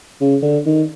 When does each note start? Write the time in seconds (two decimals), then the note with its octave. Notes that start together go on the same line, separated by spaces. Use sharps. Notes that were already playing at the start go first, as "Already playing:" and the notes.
0.21 C#3
0.43 D3
0.66 D#3